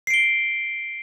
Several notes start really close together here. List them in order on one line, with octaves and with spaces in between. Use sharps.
C7 D7 G7